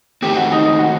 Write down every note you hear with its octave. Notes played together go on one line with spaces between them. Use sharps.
D#3 A3 C4 G4
F#4
D#4
D#4
F#4